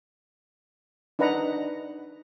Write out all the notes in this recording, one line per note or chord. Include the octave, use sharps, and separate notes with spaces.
D4 D#4 B4 F#5 A#5